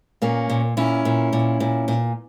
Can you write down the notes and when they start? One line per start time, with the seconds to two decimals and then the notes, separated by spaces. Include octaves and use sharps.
0.22 A#2 A#3 C#4
0.50 A#2
0.77 A#2 C#4 E4
1.05 A#2
1.33 A#2
1.60 A#2
1.88 A#2